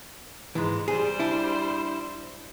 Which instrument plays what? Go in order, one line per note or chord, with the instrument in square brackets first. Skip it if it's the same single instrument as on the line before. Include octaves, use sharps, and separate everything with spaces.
[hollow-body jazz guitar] G#2 E3 [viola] G#3
[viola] G3 C5 [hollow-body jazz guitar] G#4
[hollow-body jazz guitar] D4 E4